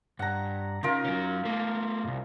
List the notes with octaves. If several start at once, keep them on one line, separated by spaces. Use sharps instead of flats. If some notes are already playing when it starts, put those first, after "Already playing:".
G2 F#5 A#5
C#3 D#4 F4 A#4
F#3 C#4
A3 A#3
C2 G#2